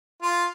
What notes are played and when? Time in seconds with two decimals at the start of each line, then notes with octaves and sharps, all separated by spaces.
0.22 F4